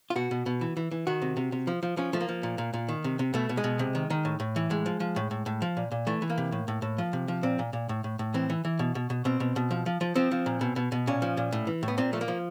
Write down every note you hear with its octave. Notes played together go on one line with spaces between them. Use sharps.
F4
B2 F#4
B2
B2
E3
E3
E3
D#3 F#4
C3
C3
C3
F3
F3
F3 C#4
F3 A3
A#3
F3
A#2
A#2
A#2
D#3
C3
C3
B2 A3
B2
G#3
B2
C3
D#3
D#3
A2
A2
E3
A2 G#3
F3
F3
A2
A2
A2
F3
A#2
A#2
E3 A3
E3
A#3
C3
A2
A2
A2
F3
C3
F3
A#2 C4
A#2
A#2
A2
A2
A2
E3 C4
E3
E3
B2
B2
B2
B2 C4
B2
B2
F3
F3
F3
F3 C4
F3
A#2
B2
B2
B2
A#2 C#4
F3
A#2
A2
E3
A2
B3
A#2 C4
F3 A3
A#3
F3